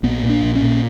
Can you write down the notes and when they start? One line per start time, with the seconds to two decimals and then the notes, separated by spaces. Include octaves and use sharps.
0.03 A#1 B3
0.23 A#2
0.29 D4
0.42 A#1
0.55 C#4
0.63 A#2